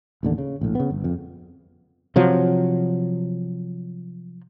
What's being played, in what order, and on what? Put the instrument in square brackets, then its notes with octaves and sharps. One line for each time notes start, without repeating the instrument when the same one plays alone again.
[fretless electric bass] A1 D#2 D3
C#3
A#1 A2
C#3 B3
G1
F2
C3 F3 F#3